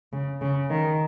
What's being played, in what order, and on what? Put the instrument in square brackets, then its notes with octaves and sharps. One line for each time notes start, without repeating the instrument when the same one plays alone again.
[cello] C#3
C#3
D#3